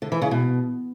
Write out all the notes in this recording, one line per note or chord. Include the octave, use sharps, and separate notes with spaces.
D3
E3
C#3
B2